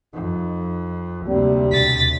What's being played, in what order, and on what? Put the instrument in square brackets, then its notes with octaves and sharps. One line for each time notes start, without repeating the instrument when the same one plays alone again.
[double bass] F2 [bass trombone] D#4
[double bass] D2 C3 [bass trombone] G3 [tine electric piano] A#3 C4
[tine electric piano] D#2 B2 [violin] A6 B6